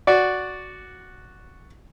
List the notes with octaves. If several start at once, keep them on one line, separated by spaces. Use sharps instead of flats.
F#4 D5